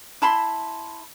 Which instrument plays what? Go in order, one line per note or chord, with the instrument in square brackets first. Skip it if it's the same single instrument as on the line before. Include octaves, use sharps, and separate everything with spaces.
[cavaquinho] E4 A5 B5 C6